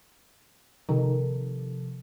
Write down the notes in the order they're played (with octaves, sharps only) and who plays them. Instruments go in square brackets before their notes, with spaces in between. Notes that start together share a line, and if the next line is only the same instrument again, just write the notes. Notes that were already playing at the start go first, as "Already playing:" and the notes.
[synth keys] C3 F3 A4 [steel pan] D#3